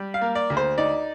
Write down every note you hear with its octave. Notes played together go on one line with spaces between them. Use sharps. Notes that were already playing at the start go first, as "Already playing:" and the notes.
Already playing: G3
F5
A#3
D5
D2
C5
D#4 D5